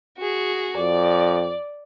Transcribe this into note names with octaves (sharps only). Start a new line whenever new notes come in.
F#4 G#4
F2 D5